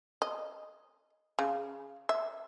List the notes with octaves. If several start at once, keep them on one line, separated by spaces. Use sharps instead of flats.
D#5
C#3
E5